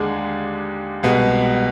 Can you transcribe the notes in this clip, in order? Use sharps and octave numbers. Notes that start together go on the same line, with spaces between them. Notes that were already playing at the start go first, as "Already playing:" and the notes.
Already playing: D#2 D3 G#3 D4 G#4
C2 B2 G#3 B3